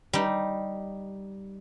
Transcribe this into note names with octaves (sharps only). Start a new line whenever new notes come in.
G3 D#4